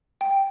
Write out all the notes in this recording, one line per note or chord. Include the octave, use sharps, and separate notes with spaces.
G5